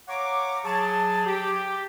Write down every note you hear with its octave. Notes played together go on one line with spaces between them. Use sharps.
C#5 F5 F#5 A#5 C#6 D6
F#3 G#4 A5
G4